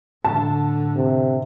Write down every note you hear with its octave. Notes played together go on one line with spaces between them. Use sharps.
A2 D3 A5
C3